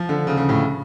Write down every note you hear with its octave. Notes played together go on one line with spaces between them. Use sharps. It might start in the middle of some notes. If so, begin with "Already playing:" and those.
Already playing: F3
D3
C#3
C#3
A2